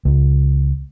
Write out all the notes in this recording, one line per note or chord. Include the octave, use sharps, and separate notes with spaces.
C#2